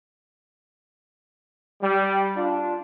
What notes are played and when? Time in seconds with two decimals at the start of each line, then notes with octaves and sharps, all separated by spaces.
1.81 G3
2.35 D4 F4